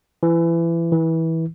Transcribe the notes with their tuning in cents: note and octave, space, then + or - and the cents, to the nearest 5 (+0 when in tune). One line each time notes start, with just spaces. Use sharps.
E3 +25
E3 -20